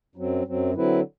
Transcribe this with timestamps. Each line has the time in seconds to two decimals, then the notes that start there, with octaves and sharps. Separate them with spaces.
0.16 F#2 F#3 C4
0.45 F#2 F#3 C4
0.74 D3 F#3 C4 E4 B4